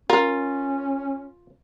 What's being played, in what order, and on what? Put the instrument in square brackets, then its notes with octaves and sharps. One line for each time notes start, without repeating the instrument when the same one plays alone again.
[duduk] C#4 [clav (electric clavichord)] F4 [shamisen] A#4